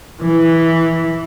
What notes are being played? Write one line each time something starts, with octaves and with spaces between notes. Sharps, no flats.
E3